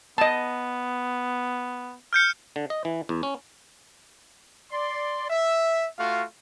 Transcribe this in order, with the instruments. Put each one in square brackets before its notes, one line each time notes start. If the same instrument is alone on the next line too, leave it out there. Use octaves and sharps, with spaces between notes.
[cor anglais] B3 [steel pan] D#5 A5
[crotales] F6 G6 C#7
[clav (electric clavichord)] D3
D#5
E3
E2
C#4
[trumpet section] D5 C6
E5
A3 F4 F#4 F5